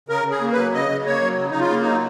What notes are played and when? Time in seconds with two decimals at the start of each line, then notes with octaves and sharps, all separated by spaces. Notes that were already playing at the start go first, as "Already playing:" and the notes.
0.09 C#3 A#4
0.25 C#3
0.31 G#4
0.41 A#3
0.52 B4
0.57 F#3
0.73 C#3 D#5
0.90 C#3
1.06 A#3 C#5
1.22 F#3
1.38 C#3
1.51 C#3 D#4
1.60 F4
1.70 A#3
1.81 D#4
1.86 F#3